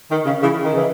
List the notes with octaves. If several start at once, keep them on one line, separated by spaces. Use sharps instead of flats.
D#3
C#3
C#3 E3
D#3
C#3 E3